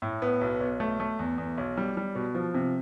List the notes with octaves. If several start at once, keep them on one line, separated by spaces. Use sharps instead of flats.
A2
B3
B1
B1
A3
A3
E2
E2
B1
G3
G3
B2
F3
C3